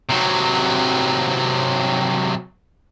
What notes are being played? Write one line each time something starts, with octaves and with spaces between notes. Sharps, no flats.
C3 F#3